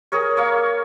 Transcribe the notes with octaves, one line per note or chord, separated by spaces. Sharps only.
G#4 A#4 C#5
A#3 C#5